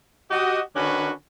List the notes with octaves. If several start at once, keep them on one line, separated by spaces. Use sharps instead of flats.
F#4 G4 D#5
D3 D#3 C#4 D4 F#4 B4